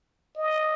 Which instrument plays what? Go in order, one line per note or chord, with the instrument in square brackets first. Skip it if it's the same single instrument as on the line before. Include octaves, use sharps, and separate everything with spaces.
[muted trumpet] D#5